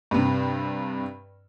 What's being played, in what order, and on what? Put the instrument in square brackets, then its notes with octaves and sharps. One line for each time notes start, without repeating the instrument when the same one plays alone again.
[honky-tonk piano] G2 C3